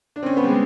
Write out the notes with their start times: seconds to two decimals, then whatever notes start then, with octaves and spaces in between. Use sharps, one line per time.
0.16 D4
0.23 C4
0.26 C#4
0.37 B3
0.44 G3
0.48 G#3